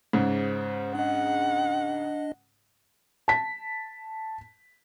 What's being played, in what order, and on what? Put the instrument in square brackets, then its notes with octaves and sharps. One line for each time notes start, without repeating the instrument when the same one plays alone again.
[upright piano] G#2 C#3 [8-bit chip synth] C5
[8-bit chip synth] D4 D#5 [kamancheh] F#5
[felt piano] A5 B6